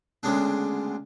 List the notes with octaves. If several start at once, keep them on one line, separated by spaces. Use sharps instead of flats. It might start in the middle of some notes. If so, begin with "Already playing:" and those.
D2 C#3 G#3 B3 D4